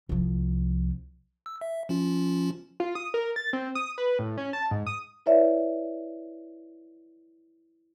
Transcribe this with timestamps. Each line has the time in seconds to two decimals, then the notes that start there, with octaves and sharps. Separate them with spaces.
0.09 C2 F3
1.46 E6
1.61 E5
1.89 F3 C#4 F4
2.80 F4
2.95 D#6
3.14 A#4
3.36 A6
3.53 C4
3.75 D#6
3.98 B4
4.19 A2
4.38 C#4
4.53 A5
4.71 G#2
4.87 D#6
5.26 E4 B4 C#5 D5 E5